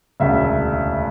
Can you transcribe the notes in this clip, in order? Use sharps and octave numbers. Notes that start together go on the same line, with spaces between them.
E1 D2 C#3 E5